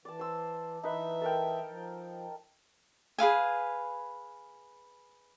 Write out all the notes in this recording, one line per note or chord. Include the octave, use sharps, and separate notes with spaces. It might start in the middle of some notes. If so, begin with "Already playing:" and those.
E3 D5 A5
C5 E6
E3 D#4 B4 E5
A4 A#4 G5
F3
G#4 B4 F5 G#5